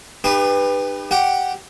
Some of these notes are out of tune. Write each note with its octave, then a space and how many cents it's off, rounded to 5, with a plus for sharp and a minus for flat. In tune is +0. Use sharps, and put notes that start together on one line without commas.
D#4 -45 G4 +35 B4 +0
G4 -5 F#5 +0